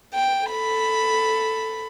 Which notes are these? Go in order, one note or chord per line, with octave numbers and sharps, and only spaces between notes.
G5
A4 B5